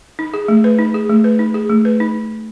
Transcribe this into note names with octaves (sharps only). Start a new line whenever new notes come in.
D#4
G#4
A3
B4
D#4
G#4
A3
B4
D#4
G#4
A3
B4
D#4